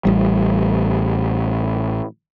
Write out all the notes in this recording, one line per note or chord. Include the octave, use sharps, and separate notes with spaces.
A1 G3